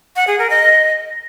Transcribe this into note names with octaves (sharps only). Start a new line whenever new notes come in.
F#5
G#4
A#4
D#5